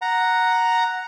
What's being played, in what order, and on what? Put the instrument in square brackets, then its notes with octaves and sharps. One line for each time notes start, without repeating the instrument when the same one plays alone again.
[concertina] F#5 A#5